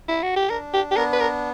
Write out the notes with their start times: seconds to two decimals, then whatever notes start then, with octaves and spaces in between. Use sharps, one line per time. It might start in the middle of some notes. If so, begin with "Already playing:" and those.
0.08 E4
0.23 F#4
0.36 G4
0.50 D4 A#4
0.74 G4
0.91 G4
0.96 B3 A#4
1.13 B4
1.20 A#4